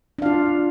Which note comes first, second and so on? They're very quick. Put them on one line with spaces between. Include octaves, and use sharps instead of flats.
D4 F5 F4